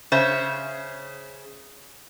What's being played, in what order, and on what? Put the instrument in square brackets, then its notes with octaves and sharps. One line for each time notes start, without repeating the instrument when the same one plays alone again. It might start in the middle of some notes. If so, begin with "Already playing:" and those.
[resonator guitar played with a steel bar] C#3 C5 C#5 E5